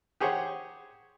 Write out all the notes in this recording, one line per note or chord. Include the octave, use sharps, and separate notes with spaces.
G4 G#4 C5 C#5 F#5